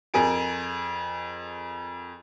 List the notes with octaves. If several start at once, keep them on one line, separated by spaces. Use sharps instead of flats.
F2 G#4 A#4 G#5 D7